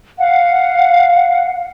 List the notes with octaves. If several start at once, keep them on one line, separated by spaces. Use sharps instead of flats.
F5 F#5